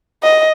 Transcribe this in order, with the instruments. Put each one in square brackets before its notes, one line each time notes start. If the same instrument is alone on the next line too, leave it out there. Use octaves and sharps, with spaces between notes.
[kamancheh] D#5